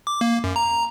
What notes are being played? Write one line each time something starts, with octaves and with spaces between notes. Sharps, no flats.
D6
A#3
F#2
A#5